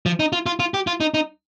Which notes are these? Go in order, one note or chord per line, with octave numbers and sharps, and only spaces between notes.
F3
D#4
F4
F4
F4
G4
F4
D#4
D#4